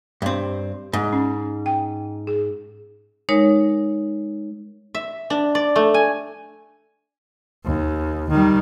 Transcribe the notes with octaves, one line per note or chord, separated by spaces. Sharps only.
G2 C4
G#2
C#4
G5
G#4
G#3 D#4 A#4 C#5
E5
D4
D5
A3
G#5
D#2
D#3 G3